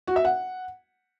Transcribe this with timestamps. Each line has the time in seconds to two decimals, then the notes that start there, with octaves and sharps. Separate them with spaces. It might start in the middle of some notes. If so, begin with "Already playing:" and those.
0.07 F#4
0.16 E5
0.25 F#5